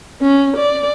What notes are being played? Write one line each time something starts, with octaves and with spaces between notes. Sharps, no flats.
C#4
D5